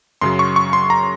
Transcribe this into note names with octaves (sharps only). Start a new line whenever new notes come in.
F#2 C#3 F#3 C6
C#6
C#6
C6
A#5